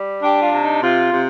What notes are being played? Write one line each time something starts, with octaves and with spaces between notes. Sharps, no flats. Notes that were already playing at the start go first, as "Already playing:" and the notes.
Already playing: G3
D4 G4
F4
C3
D#4
C3 F4
C3